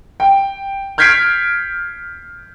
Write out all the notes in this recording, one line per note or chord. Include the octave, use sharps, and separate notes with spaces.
G5
F6 G6 G#6 B6 C7 D7